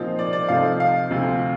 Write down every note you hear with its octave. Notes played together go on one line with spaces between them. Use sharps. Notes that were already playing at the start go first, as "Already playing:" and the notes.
Already playing: A#2 F3 C4 D#4 F4
D5
D5
C3 F3 A3 D#4 F5
F5
D2 C3 F3